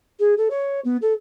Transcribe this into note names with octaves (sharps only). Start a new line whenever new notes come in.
G#4
A4
C#5
B3
A4